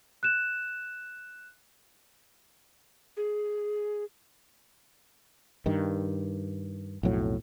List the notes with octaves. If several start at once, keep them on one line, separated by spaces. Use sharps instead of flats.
F#6 E7
G#4
G2 D#3
B1 F2 A2 F#3